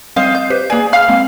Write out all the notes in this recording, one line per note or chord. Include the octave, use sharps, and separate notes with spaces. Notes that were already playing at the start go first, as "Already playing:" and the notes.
G3 C4 C5 D#5 F5
G6
G4 B4 C5
A#3 G#4 B4 D5
F5 B5 F6
G#3 A#3 C4